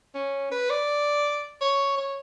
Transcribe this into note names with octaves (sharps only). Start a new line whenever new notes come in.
C#4
B4
D5
C#5
C#5